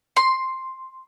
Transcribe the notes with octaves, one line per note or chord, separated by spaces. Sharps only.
C6